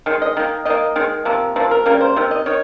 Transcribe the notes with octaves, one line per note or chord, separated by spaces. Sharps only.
D#3 G#3
D#5
D#3 A#3
D#3 A#3 D#5
D#3 G#3
C3 F3 A#3
C3 F3 A#3
A#4
C#3 G3 A#3 A#4
C5
C3 D#3
D#5
D#3 C#5